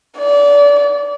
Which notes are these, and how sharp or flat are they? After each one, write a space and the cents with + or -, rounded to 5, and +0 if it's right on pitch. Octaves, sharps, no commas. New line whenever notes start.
D5 -30